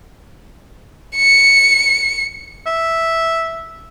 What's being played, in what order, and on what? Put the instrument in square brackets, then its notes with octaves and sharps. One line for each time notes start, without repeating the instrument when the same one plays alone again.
[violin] C#7
[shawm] E5